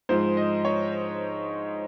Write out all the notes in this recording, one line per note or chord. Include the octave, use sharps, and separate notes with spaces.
G#2 F3 G#3 C5
D#5
C#5